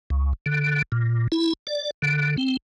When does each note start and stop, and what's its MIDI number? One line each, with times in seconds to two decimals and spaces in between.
0.10 0.33 37
0.46 0.82 50
0.92 1.28 46
1.32 1.53 64
1.67 1.91 74
2.02 2.36 50
2.38 2.57 60